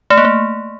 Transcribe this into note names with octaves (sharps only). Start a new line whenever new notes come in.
A3
A#3
A3